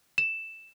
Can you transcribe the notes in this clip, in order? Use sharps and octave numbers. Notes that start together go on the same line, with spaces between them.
E7